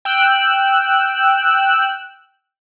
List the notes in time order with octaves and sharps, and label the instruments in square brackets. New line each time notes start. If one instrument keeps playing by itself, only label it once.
[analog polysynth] G5 E6 F#6